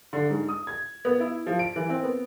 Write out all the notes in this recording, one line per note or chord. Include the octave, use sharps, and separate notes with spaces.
D3
G#2
D#6
G#6
B3
E4
F3
D7
E3
C4
B3